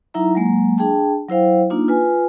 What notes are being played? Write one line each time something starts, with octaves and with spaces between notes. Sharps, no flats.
F#3 D#4 E4 E5 A#5
F#3 G#3 A#3
D4 G#4 G5 A5
F#3 E4 C5 F5 G5
A#3 D4 D#4 F4
F4 B4 G#5